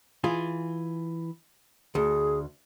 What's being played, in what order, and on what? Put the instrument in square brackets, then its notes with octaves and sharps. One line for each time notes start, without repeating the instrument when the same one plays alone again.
[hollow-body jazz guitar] E3 F4 G#4
[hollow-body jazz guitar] D2 [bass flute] G#4